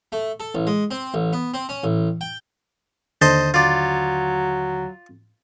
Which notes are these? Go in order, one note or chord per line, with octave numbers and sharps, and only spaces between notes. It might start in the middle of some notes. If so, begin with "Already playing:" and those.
A3
A4
A1
G#3
C4
A1
B3
C4
C#4
A1
G5
D#2 D3 C5 D#5 A5 G6
F#3 F4 D5